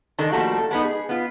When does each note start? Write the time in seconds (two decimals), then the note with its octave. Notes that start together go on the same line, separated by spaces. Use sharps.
0.18 D#3 G#3 D4 A4 A#4
0.32 F3 G3 A3 A#3 F#4
0.58 A4
0.71 G#3 B3 D#4
0.85 G#4
1.09 B3 F4